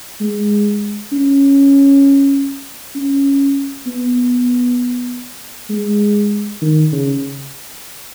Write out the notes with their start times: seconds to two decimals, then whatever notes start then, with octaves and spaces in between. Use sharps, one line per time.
0.21 G#3
1.12 C#4
2.95 C#4
3.86 B3
5.70 G#3
6.62 D#3
6.92 C#3